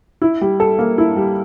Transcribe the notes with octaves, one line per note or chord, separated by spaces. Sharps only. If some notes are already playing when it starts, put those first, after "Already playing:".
E4
G3
A4
A#3
E4
G3